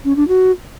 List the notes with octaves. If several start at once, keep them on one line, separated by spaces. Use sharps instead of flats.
C#4
D4
F#4